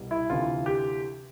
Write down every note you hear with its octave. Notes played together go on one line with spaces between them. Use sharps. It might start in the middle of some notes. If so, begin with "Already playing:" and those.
Already playing: C2 B2 G3
E4
D2 C3 E3 F4
G4